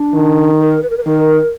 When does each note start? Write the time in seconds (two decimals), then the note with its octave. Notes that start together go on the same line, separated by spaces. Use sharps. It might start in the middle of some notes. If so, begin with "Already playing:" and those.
Already playing: D4
0.14 D#3
0.60 A#4
0.83 B4
0.90 A#4
0.97 B4
1.06 D#3 A#4